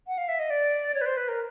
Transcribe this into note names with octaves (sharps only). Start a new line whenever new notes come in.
F#5
F5
E5
D#5
D5
C#5
B4
C5
B4
A#4